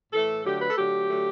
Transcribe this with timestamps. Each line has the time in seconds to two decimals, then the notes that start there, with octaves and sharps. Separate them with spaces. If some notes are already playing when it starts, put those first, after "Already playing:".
0.13 A2 E3 A3 A4
0.44 D3 F#3 A3 G4
0.61 B4
0.70 A4
0.77 D3 F#3 A3 G4
1.09 D3 F#3 A3